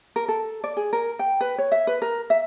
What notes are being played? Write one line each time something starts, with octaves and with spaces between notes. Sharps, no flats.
A#4
A4
D5
G#4
A#4
G5
B4
C#5
E5
B4
A#4
E5